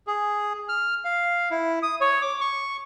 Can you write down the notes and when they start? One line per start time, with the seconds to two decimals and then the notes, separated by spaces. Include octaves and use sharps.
0.07 G#4
0.69 F6
1.05 F5
1.51 E4
1.83 D#6
2.01 C#5
2.22 D6
2.41 C#6